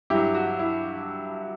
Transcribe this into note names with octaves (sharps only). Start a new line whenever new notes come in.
G2 F#3 E4 G4
F#4
E4